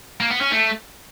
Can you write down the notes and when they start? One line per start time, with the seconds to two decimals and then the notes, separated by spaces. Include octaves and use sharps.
0.20 A#3
0.31 B3
0.41 C#4
0.52 A3